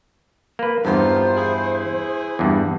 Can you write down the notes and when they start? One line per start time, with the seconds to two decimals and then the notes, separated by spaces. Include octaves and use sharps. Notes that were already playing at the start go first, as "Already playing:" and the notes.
0.59 A#3 B4
0.85 E2 G2 D#3 B3 F4 C5
1.36 E4 G#4
2.39 E2 G2